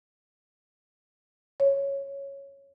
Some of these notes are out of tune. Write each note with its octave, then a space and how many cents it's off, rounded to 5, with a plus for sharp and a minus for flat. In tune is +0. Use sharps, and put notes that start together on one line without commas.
C#5 +0